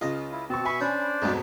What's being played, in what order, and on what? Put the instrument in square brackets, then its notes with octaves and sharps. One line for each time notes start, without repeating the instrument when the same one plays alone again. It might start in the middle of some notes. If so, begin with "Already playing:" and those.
[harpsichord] C#2 D#5 [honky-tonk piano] C#3 F4
[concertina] E4
[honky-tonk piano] B2 C#6 [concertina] C4 A5
[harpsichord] B2 [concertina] E5 C#6 [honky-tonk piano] G#5 B5
[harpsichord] C#4 [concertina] D4 C5 D5
[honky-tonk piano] F2 G#2 [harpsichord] B2 F#3 G#3